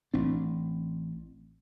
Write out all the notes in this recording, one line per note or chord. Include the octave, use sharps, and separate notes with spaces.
A1 C4 D4